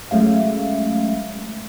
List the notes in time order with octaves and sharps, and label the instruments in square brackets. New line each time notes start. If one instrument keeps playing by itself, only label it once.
[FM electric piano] F#3 G#3 A3 C#4 E5 F5